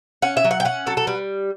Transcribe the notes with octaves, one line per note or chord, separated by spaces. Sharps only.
C#4 F#5
E5
F#3
F#5
G5
C#4 F#5
F#3 A4
A4
G3 B4